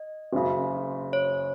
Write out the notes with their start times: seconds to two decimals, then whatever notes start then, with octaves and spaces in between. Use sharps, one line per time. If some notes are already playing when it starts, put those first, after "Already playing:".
Already playing: D#5
0.33 F#1 F#2 C#3
1.13 C#5